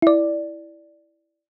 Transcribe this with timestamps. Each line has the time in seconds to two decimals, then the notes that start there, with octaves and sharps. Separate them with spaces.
0.02 E4 D5